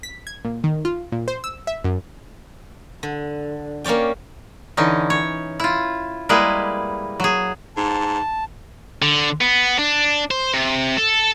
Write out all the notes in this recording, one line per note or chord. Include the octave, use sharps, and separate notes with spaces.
B6
G#6
A#2
D#3
F4
A#2
C5
E6
E5
F#2
D3
A#3 C#4 C#5 D5 G5
D3 E3 C#4 D#4
C#5
E4 F4
G3 G#3 A#3 E4 G#4 B4
F#3 G#4
G#2 A5
D3
B3
D4
C5
C3
A4